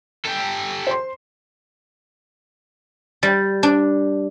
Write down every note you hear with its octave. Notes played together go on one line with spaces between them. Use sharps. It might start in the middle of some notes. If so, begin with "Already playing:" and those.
G4 A4
C5 C6
G3
D4